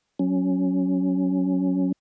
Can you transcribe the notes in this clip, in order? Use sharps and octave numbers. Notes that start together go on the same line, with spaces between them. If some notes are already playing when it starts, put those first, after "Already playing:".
F#3 C#4